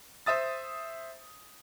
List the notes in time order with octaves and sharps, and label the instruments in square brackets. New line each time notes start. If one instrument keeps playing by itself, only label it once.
[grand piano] C5 E5 D#6 A6